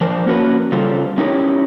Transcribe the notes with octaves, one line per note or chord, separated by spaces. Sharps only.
F3 D4 A#4 C5
A#3 C#4 F#4 A#4 B4
C#3 G3 F4 A4 C5
C#4 D#4 E4 G4 A#4 C#5